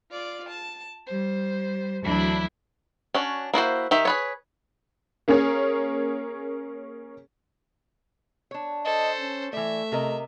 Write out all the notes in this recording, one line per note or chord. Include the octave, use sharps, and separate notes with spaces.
F4 D5
A5
G3 C5
D2 E3 F#3 D4 E4 B5
C#4 D4 F#4
A#3 E4 F#4 C5
D#3 G4 E5
G#4 B4 C#5
A#3 C#4 G#4 A#4 C#5
D4 C#5
A4 C5 D#5
C#4
E3 A3 D5 E5
C3 A#4 D#5